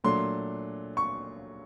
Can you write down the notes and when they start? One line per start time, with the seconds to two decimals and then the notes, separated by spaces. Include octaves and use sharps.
0.04 A#2 F#3 A3 D4 C6
0.97 C#6